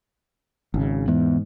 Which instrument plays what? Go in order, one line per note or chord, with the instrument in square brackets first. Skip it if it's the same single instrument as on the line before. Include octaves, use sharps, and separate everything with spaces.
[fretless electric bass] G#1 C#3
[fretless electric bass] G#2 [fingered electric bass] E3 B3